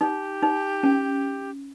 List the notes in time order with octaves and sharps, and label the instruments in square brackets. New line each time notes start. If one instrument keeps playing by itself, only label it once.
[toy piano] D#4 [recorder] G4
[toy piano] D#4
C#4